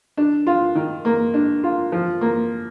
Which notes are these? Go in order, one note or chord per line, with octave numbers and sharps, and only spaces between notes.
D4
F4
D#3
A#3
D4
F4
F3
A#3